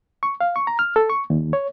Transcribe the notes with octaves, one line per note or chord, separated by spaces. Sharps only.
C#6
F5
C#6
A#5
F6
A4
C#6
D#2
C#5